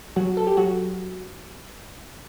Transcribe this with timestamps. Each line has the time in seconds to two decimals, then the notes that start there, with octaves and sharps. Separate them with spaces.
0.16 F#3 F#4
0.37 A4
0.47 G4
0.57 F#3 F#4